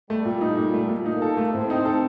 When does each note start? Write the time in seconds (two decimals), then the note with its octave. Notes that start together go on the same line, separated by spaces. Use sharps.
0.10 G3 A3
0.25 A#2
0.41 D#4
0.58 A#2
0.74 A3
0.89 A#2
1.05 A#3 D#4
1.22 A4
1.37 A3
1.54 A2 C4
1.70 D#4
1.85 A4